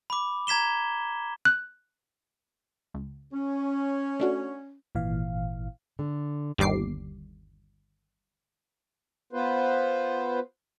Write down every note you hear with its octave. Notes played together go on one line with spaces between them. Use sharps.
B5 D6
A#5 G#6 B6 E7 G7
F#6
C#2
C#4
A3 D4 F#4
G#1 A#2 E3 F5
D3
G1 D#2 G3 D6 C7
B3 F4 B4 C5